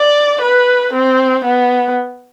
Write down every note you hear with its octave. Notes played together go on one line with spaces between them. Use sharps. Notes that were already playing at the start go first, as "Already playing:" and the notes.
Already playing: D5
B4
C4
B3